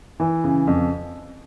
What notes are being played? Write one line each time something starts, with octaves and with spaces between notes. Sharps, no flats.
E3
C#3
F2